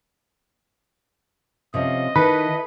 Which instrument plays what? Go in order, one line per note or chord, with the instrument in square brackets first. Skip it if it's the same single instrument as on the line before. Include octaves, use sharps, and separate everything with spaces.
[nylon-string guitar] C3 F3 C#4 [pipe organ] D#5
[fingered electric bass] D#3 [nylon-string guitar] E4 A4 [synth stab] B4